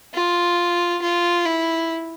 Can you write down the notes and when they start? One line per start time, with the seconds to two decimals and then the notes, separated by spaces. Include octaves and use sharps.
0.14 F4
1.02 F4
1.46 E4